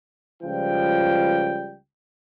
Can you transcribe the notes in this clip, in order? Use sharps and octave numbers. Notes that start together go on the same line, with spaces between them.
C#2 F3 G3 G5